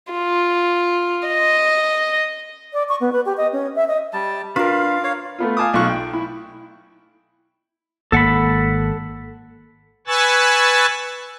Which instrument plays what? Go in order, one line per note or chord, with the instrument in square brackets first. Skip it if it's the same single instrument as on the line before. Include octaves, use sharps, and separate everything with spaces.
[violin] F4
D#5
[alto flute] D5
C#6
B3
B4
G4
D#5
C#4
E5
D#5
[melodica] G3 A5
[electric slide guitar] D4 B4 [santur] F4 A#4 [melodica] F5
[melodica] C#5 F5
[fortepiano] A3 B3 F4
F5 G#5 A5 D6 D#6
B1 F4 C#6 F#6
G5
E4
[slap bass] G#1 A#3 [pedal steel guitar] A4 F#5 B5
[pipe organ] B4 G#5 C#6 E6 F#6 A6